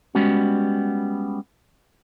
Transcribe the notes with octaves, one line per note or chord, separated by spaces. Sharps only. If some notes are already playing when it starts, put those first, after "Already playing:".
G3 G#3 B3 C#4 F#4